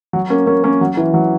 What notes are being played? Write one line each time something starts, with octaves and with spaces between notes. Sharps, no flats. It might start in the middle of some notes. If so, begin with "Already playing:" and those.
F#3
A#3 C#4
A#3 C#4
A#3 C#4
F#3
E3
F#3